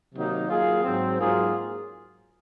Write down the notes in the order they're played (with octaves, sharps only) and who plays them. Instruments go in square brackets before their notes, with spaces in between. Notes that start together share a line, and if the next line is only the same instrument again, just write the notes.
[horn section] C3 D#3 F#3 A#3 D#4
F#3 A#3 F4 G#4
G#2 F#3 C4
G#2 F#3 A#3 F4 G#4